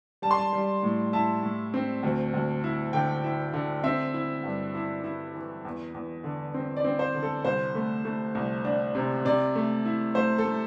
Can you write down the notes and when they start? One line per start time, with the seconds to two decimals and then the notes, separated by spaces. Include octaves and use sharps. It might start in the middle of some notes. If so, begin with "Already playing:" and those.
0.22 G3 A5
0.31 C6
0.38 A5
0.53 G3
0.83 A2
1.13 E4 A5
1.43 A2
1.74 C4
2.03 D2
2.34 D2
2.64 E4
2.93 D3 G5
3.24 E4
3.53 D3
3.84 C4 E5
4.14 E4
4.44 G2
4.75 E4
5.04 E4
5.34 E3
5.65 E2
5.94 E2
6.24 D3
6.54 C4
6.77 D5
6.84 C4
6.99 C5
7.14 D3
7.23 A4
7.45 C2 C5
7.75 A3
8.05 A3
8.35 C2
8.65 D4
8.95 C3
9.25 C3 D5
9.55 A3
9.86 E4
10.15 A3 C5
10.38 A4
10.46 A3